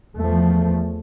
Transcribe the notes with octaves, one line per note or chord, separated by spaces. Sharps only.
E2 F3 A3